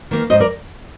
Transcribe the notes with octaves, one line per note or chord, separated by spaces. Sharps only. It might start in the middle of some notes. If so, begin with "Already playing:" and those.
D#3 A#3
G#2 C5 D#5
A#4 D5